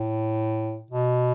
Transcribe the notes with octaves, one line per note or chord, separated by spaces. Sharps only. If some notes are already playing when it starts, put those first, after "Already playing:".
Already playing: A2
B2